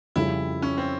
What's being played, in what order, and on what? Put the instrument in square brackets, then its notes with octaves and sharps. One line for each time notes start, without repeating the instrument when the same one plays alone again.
[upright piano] F2 C#3 G3 C#4 F4 [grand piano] E4
[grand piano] C#4
C4